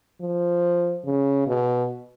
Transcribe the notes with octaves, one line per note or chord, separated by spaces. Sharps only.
F3
C#3
B2